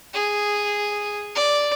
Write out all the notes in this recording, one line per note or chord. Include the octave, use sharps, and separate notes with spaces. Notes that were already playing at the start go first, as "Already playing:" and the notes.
G#4
D5